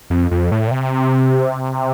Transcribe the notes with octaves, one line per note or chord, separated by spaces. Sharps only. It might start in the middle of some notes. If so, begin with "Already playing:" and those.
F2
F2
A2
A#2
C3